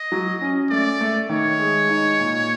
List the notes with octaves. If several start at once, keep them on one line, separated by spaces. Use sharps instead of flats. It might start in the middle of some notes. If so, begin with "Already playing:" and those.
Already playing: D#5
F#3
C#4
A3 D5
A3
D#3 C#5
G#3
D#4
A#2